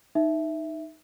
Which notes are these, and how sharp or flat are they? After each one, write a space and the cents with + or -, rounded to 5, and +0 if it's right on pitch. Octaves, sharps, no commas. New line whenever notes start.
D#4 +0 E5 +0